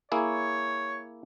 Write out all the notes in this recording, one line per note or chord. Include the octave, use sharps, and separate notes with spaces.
A#3 E4 G#4 C#5